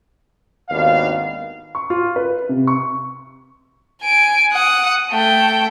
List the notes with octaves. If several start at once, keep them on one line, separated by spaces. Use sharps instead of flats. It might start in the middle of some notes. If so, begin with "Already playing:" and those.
G#1 D#2 B3 D4 F5
C#6
F4
B4
C3
C#6
G#5 D7
F#5 D#6
A3 G5